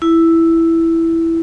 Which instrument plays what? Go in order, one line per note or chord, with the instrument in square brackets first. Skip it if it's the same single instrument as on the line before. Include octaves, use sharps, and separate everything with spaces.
[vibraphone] E4